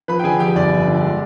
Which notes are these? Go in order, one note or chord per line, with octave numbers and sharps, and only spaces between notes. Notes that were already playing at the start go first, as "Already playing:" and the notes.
F3 B4 B5
G5
D3 G#4 G#5
F2 G4 G5
G1 D5
F3
D3
G#3